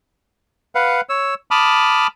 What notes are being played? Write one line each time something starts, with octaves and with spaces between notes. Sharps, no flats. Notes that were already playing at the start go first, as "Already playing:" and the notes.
B4 F5 F#5
C#5 E6
A5 B5 D6 D#6 F6